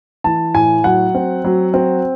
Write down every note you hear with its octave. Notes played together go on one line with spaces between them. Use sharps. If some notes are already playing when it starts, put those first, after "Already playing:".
E3 A5
A2 G#5
F#3 F#5
C4
F#3
C4